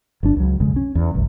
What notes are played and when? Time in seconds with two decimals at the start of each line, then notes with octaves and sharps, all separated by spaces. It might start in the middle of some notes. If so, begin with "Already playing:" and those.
0.23 G1 F#3 D4
0.36 C#2 F#3
0.60 B1 F2 C#3 G#3
0.76 C#4
0.95 E2
1.14 G#1 C#2 F#2